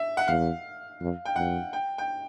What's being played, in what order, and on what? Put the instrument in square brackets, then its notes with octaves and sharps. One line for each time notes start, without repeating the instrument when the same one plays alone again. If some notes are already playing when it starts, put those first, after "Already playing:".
Already playing: [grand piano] E5
F#5
[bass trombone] E2 [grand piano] F5
[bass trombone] F2
[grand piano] G5
[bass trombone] F2 [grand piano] F#5
[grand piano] G5
G5